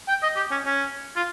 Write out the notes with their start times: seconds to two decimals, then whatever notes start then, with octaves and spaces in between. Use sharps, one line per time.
0.08 G5
0.23 D#5
0.36 G4
0.51 C#4
0.66 C#4
1.16 F4